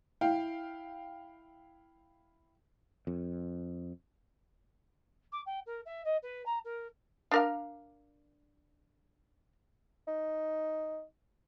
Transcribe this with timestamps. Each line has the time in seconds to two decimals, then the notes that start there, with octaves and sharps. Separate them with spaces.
0.21 E4 F5 G5
3.07 F2
5.32 D6
5.45 G5
5.65 A#4
5.85 E5
6.04 D#5
6.22 B4
6.45 A#5
6.64 A#4
7.31 D4 A#4 F5
10.08 D#4